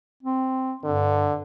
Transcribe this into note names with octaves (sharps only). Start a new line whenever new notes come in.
C4
G2 D3